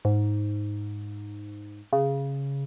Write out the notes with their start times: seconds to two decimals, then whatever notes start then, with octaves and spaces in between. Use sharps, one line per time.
0.05 G#2
1.93 C#3